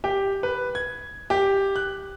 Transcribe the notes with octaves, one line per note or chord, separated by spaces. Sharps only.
G4
B4
G#6
G4
F#6